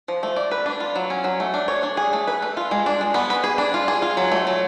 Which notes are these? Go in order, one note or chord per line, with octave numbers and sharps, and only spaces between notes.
F3
A3
D5
B4
D4
F4
F#3
C#4
F#3
A3
D4
C#5
D4
G#4
A3
B4
A3
F4
G#3
D4
G#3
B3
B4
G#4
D4
F4
G#4
F4
F#3
A3
F#3